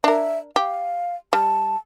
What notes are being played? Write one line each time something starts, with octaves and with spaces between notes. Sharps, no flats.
D4 A#4 E5
G4 F5
G3 A5